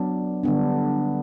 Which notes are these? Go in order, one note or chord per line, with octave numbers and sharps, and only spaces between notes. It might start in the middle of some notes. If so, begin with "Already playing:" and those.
Already playing: F#3 B3 D4
D3 G3 B3 D4